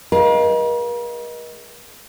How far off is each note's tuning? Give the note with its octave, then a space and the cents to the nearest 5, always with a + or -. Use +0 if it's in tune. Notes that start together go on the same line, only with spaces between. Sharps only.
G#3 +10 A#4 +45 F5 +5